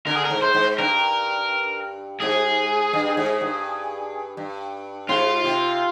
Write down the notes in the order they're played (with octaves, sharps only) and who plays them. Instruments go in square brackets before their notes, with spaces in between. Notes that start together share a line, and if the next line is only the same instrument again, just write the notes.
[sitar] D3 [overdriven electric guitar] A#4
[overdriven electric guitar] G#4
A#4
[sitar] G#2
[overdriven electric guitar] C5
[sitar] G#2
[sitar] G2 [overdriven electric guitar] A#4
[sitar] G#2 [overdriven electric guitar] G#4
[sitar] G2
G#2
G2
G2
[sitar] G#2 [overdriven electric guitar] F4
[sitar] C3